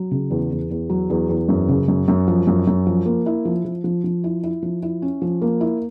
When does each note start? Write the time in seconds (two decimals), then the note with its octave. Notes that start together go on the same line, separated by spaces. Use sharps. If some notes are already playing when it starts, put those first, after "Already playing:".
Already playing: F#3
0.11 C#3
0.30 E2
0.51 E2
0.71 E2
0.90 F#3
1.10 E2
1.29 E2
1.49 F#2
1.69 C#3
1.88 F#2
2.08 F#2
2.28 F3
2.47 F#2
2.67 F#2
2.87 F3
3.06 A#3
3.26 E4
3.45 F3
3.64 F3
3.84 F3
4.04 F3
4.24 E4
4.44 E4
4.62 F3
4.83 E4
5.02 C#4
5.22 F3
5.42 A#3
5.61 E4